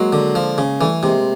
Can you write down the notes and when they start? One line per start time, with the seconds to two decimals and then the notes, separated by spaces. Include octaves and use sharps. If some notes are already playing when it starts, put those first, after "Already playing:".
Already playing: F#3 G#3 A#3
0.13 D3
0.35 F3
0.58 C#3
0.80 E3 G3 A3
1.03 C3 G#3 A#3